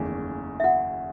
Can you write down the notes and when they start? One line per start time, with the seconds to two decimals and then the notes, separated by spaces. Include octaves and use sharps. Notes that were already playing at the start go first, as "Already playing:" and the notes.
Already playing: F#1 E2 D#3 A3 C#4 G#4 G#5
0.60 E5
0.64 F#4 F#5